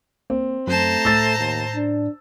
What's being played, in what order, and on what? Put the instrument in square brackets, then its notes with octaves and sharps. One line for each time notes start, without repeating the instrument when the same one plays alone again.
[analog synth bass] A#3 [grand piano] C4
[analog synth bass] F#2 [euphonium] A3 [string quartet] C5 A5 A#5
[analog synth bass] A2 [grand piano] E6 A6
[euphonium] D#2
D4